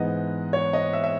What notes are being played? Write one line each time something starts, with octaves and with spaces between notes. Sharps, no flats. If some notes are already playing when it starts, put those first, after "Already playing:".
Already playing: G#2 E3 B3 D#5
C#5
D#5
E5
E5